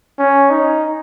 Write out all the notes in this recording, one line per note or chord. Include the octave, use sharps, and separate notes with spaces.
C#4
D#4